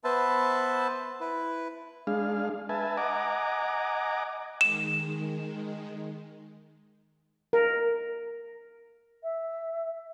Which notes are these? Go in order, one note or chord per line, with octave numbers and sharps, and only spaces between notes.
B3 B4 C5 E5 A5
E4 B4
G#3 D4 G#4 F5
B4 E5 G#5 A5
D#5 F#5 G#5 A#5 D6
D#3 G#3 E7
A#4
E5